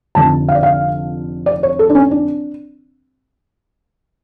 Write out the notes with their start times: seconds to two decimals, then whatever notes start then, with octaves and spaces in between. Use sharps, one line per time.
0.15 F1 F2 D3 A5
0.48 F5
0.55 D5
0.63 F5
1.46 D5
1.63 C#5
1.79 A4
1.89 D4
1.95 C#4
2.11 D4